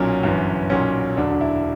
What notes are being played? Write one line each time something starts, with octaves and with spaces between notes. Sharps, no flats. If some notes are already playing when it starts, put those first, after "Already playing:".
Already playing: B1 A#2 F#3 C#4
G1 F#2 E3
B1 A#2 F#3 C#4
E1 D2 D3 F#3 D4
D4
E4